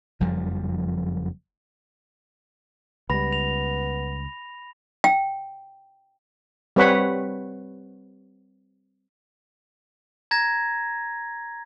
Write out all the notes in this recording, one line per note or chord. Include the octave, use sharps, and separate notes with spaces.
F#1 F2 F3 G3
C#2 G3 B3 B5 A#6
F7
G5
G3 C4 B4 C#5 F#5 B5
A#5 G#6 A#6